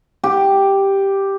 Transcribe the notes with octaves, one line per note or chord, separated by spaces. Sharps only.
G4